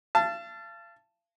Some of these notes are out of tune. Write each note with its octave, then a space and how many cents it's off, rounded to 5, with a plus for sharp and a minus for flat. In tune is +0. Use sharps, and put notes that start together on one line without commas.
F5 -40 A5 +0